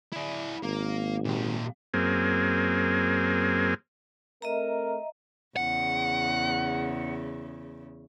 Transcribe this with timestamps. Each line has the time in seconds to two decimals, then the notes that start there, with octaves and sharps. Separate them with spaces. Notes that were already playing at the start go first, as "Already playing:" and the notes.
0.12 E4 D5
0.63 G#1 A#3
1.25 A#2 G4
1.94 F#2 A#3 C4 G#4
4.42 A3 C4 A#4 D#5 E5 A#5
5.56 E2 C#3 F#5